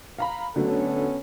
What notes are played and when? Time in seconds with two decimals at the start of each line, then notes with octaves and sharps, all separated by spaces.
0.19 F5 A#5 B5
0.56 D3 F#3 A3 B3 C#4 A4